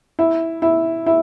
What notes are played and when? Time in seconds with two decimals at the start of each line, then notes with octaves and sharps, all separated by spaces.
0.19 E4
0.62 E4
1.06 E4